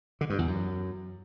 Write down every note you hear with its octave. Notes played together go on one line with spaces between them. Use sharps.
D3
G2
E2
F#2